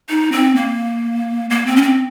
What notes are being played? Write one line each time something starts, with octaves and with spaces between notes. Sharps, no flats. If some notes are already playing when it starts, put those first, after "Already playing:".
D#4
C4
A#3
A#3
C4
C#4
C4